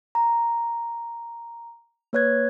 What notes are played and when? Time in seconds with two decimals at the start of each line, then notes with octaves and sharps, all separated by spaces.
0.15 A#5
2.13 A#3 B4 C#5 F#6 G#6